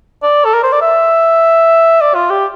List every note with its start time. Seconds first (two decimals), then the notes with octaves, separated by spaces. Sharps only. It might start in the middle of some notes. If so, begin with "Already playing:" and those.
0.23 D5
0.45 A4
0.54 A#4
0.63 C5
0.72 D5
0.81 E5
2.01 D5
2.15 F4
2.30 G4